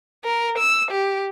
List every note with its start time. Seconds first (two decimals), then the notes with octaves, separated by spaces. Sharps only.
0.24 A#4
0.59 E6
0.91 G4